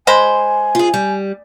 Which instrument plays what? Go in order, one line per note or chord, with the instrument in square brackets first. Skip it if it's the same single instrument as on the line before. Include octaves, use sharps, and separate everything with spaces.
[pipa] G#3 C5 B5 [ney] G#5
[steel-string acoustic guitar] F4 G#4
G3